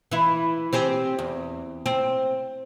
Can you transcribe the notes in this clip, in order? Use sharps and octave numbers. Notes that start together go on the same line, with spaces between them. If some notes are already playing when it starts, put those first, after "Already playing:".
E3 E4
C4 G4 G#4
E2
C4